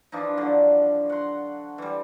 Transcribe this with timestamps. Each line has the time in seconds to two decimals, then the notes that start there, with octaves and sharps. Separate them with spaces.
0.12 E3 F3 D4 D#4
0.37 D3 F3 F#3
1.09 F#5 C6
1.78 E3 G3